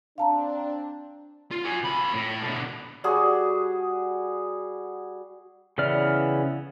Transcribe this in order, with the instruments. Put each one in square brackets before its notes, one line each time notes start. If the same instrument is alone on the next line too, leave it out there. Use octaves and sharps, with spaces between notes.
[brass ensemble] C4 D4 [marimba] F5 A5 A#5
[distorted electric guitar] F4
F#4 G#5
F2 B5
A2
B2 D3
[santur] G3 F#4 G#4
[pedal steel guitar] C#3 E3 B3 D5 F6